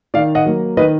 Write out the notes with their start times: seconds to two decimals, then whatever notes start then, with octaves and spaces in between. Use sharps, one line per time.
0.14 D#3 D5 F5
0.35 D#5 F#5
0.46 F#3 A#3
0.77 D#3 B4 D#5